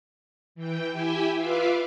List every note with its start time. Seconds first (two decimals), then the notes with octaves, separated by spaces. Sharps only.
0.55 E3 G5
0.92 E4 G4 E5 G5 G#5
1.35 F4 B4 E5 F5 D6